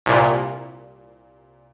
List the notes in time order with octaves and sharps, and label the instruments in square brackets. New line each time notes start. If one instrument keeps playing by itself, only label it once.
[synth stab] C2 A#2